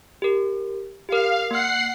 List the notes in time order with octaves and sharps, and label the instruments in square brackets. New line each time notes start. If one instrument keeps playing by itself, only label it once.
[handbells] G4 A#4
[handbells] G4 A#4 [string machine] F5
[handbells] A#3 F6 [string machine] F#5 C7